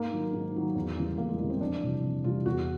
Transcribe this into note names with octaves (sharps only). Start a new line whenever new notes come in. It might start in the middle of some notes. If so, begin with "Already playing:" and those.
Already playing: G#2 A#3
D#3 F#3
G#2
D#3 F#3
E2
C#3 E3 G3
E2 A#3
G#3
C#3 E3 G3 G#3
C4
F2 D4
C3 E3 G3
F2
C3 E3 G3 F4
E2 F#4